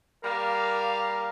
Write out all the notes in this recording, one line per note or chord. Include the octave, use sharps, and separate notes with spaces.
G3 A#3 A#4 F5